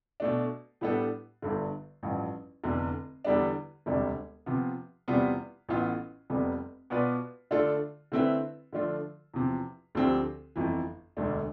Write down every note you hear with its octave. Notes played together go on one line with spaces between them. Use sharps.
B2 A3 D4
A2 G3 B3 D4 A4
G1 G2 D3
A1 G2 F3
F1 E2 D3
E2 D3 G3 B3 D4
E1 D2 C3 G3 D4
C3 F3 B3 F4
E2 C3 G3 B3 F4
A1 A2 E3 B3 F4
F1 F2 C3 G3 B3
B2 B3 F4 B4 D5
D3 A3 D4 F4 A4
D3 A3 C4 E4 B4
D3 F3 A3 D4 F4
E2 C3 F3
D2 D3 F3 C4 G4
G1 F2 E3
E1 D2 D3 A3 D4